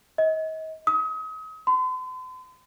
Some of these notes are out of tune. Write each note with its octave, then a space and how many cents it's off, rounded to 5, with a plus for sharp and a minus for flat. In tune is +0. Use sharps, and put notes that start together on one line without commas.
D#5 +35
D#6 +35
C6 -45